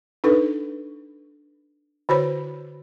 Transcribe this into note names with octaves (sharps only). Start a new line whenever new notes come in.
D4 D#4 A4 B4
D3 F#4 C5 C#5 B5